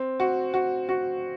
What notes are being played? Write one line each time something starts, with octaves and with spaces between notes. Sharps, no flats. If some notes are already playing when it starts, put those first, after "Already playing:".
Already playing: C4
F#4
F#4
F#4